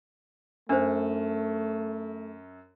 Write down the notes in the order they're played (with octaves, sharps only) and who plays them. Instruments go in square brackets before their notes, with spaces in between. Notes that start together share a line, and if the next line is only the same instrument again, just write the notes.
[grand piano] F#2 [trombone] A3 [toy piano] D4 C5